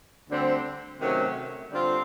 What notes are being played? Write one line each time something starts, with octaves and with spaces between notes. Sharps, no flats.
D2 D3 G3 C4
C3 D#3 F#3 A3 C#4
D3 G3 C4 F4